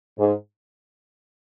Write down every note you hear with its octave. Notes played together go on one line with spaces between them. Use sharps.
G#2